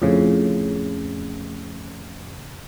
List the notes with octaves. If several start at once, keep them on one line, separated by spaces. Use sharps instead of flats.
F2 A2 C#3